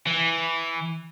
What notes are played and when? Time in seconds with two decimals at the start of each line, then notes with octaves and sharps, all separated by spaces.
0.07 E3